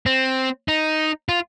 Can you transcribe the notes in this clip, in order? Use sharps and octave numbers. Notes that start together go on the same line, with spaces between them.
C4
D#4
F4